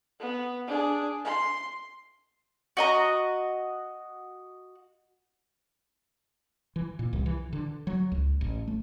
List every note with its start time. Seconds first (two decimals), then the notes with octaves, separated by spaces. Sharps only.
0.20 B3
0.67 D4 G#4
1.25 C6
2.77 F#4 D#5 A#5
6.76 E3
6.99 A#2
7.13 C2
7.26 E3
7.53 D3
7.87 F#3
8.12 C#2
8.41 A1
8.68 A3